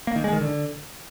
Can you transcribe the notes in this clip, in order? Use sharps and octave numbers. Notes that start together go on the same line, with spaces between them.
A#3
D#3
G#3
D#3
D3